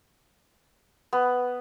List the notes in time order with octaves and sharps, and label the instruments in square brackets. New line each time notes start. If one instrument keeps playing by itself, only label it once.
[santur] B3